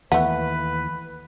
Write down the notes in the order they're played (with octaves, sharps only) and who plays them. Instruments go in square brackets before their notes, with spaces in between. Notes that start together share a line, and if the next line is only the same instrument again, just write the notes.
[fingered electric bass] D#2 E3 [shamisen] A3 B3 [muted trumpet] B4